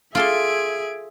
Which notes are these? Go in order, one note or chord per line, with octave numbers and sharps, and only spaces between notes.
F4 G#4 A4 E5 C6 G#6 D7